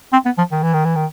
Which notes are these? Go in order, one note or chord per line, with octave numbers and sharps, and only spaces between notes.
C4
B3
F3
D#3
E3
D#3
E3
D#3